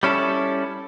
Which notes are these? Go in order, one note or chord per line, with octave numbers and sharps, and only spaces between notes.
G3 C#4 E4 A4